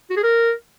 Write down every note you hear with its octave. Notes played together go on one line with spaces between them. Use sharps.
F#4
G#4
A#4